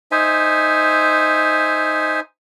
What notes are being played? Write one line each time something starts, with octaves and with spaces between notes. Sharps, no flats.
D#4 C5 E5 G#5